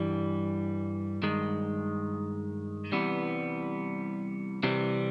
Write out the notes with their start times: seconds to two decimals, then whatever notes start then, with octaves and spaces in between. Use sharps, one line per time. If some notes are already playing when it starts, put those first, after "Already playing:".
Already playing: G2 E3 G3
1.22 G2 D#3 G#3
2.92 C2 C3 E3 G3 B3
4.63 C3 E3 G3 C4